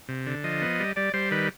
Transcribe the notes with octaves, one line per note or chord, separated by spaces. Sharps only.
C3
D3
F3 D#5
B3
G3
G3 D5
G3 C5
D#3 B4